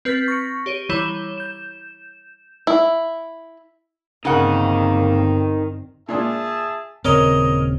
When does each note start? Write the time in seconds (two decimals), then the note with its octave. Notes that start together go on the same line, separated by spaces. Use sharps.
0.05 C4 B4 F6 G6 A6 B6
0.28 C#6 A#6 C#7
0.66 G4 C#5 D#7
0.89 E3 G3 E4 C#5 E7 G7
1.38 G6 E7
2.67 E4
4.25 G1 C#3 A#3 C4 D#4 A#4 F#5
6.09 A#2 D4 G#4 E5 A5
7.05 D#1 C#3 C4 A#4 C#5 D#5